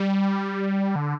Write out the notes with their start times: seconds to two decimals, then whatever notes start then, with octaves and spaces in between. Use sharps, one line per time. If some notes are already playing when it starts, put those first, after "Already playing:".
Already playing: G3
0.96 D3